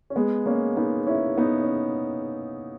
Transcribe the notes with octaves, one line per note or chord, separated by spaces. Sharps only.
C#4
G#3 B3
A#3 C#4
B3 D#4
C#4 E4
B3 D#4
C#4